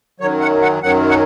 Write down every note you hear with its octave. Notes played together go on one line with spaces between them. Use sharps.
F#2 D#3 F#3 C#5
F#5
F#5
F#2 D#3 F#3 F#5
F#5